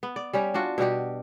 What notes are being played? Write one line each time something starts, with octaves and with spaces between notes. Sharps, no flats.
B3
D5
G3 C#4 G4
D4 F4 F#4
B2 G3 F#4 G4